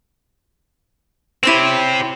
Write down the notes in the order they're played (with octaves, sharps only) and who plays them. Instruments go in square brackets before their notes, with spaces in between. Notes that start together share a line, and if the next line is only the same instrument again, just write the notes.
[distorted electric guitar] C4 G4 [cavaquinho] E4 C5 C#5